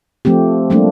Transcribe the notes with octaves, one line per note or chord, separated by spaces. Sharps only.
F3 A3 C4 G4
F#3 G3 A3 A#3 D4